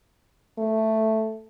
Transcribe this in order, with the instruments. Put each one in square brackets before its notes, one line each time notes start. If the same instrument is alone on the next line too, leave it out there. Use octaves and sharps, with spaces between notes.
[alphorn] A3